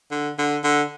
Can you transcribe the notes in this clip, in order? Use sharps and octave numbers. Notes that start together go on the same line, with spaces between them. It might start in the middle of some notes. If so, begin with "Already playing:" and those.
D3
D3
D3